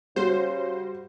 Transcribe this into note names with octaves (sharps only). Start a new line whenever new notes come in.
C#3 G3 F#4 C5